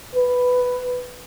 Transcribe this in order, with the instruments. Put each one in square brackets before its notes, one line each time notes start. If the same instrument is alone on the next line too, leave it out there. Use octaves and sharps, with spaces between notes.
[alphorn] B4